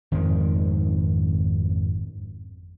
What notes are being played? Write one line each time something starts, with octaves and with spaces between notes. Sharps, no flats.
G#1 F2 G#2 D#3